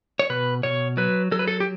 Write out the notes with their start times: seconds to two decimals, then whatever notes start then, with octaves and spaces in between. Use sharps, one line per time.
0.19 C#5
0.30 B2 B4
0.63 B2 C#5
0.97 F#3 B4
1.31 F#3 A4
1.39 B4
1.48 A4
1.60 G4